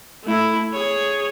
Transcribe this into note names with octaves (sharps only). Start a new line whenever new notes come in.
A3 E4
G#4 C#5